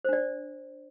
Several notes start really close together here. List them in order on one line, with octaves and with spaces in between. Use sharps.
C5 D4 D5